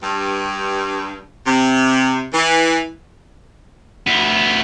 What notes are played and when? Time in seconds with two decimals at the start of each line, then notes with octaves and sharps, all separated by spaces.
0.02 G2
1.46 C3
2.33 E3
4.07 D2 B3